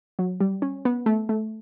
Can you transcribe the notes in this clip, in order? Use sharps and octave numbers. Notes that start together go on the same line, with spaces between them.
F#3
G3
C#4
B3
A3
A3